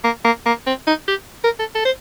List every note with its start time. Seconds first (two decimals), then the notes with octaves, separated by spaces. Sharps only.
0.04 A#3
0.25 A#3
0.46 A#3
0.67 C4
0.87 D#4
1.08 G4
1.44 A#4
1.59 A4
1.75 A4
1.85 C5